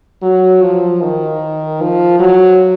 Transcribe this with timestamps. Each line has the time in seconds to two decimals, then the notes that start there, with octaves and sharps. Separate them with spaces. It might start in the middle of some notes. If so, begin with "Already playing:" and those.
0.22 F#3
0.62 F3
1.01 D#3
1.81 F3
2.20 F#3